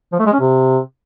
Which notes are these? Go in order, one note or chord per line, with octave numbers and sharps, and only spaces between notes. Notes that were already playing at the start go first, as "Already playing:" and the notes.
F3
A3
G#3
C#4
C3